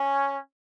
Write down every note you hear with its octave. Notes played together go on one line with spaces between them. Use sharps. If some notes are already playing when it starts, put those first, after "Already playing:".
Already playing: C#4